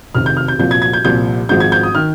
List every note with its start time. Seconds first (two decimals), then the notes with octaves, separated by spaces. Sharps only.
0.15 F1 F2 C3 D#3 F6
0.26 G6
0.37 F6
0.48 G6
0.59 C2 A#2 F3 G6
0.71 G#6
0.82 G#6
0.93 G6
1.04 C2 A#2 F3 G6
1.49 G#1 G#2 F3 G6
1.60 G#6
1.72 G6
1.83 D#6
1.95 D#3 F6